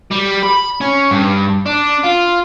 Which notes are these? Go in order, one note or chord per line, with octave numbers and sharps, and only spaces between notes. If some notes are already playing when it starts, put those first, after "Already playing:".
G3
B5
C#4
G2
D4
F4